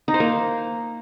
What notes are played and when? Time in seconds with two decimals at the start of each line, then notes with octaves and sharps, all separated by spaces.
0.08 D#4
0.14 C5
0.20 A#3